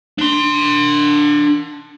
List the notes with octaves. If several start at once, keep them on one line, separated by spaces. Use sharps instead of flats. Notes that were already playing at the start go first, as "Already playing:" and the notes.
D4 C6